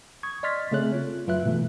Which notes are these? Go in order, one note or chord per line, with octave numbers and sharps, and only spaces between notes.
C#6 D#6 G#6
D5 D#5 C6 F6 A6 B6
C#3 A3 C4 G#4 C#5 F#6
F4
F#2 F#3 F4 B4 E5 F#6
G#2 B2 E3 A3